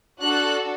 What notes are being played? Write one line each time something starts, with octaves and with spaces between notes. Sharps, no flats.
D4 F#4 A4 F#6